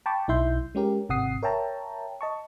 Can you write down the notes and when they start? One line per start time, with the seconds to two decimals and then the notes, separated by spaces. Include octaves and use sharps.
0.06 G5 A5 B5 C#6 D6
0.28 B1 D#4 E4 E5 C6 G6
0.75 G#3 C#4 G4 A#4
1.09 G#1 C3 F#5 D#6 C7
1.43 A#4 C#5 E5 G5 A5 A#5
2.21 D#5 A5 C#6